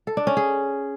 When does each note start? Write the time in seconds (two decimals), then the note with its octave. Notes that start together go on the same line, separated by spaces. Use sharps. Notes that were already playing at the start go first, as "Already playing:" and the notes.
0.07 A4
0.17 D4
0.27 C#4
0.37 G#4